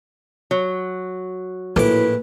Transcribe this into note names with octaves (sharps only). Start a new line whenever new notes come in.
F#3
A#1 A2 E4 B4 D6